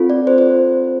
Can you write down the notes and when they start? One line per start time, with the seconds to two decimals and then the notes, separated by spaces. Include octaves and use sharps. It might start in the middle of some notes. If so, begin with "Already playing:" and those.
Already playing: C4 F4 A4
0.10 D5
0.27 C5
0.38 C5